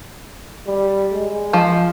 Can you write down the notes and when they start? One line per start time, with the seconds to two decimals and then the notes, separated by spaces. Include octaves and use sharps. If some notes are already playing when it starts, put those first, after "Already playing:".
0.67 G3
1.13 G#3
1.53 F3